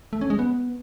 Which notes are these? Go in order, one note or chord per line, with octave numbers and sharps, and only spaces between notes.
A3
C#4
G#3
B3